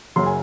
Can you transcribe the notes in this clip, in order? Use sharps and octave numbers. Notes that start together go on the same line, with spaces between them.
F#1 F#2 C#3 C6
G#5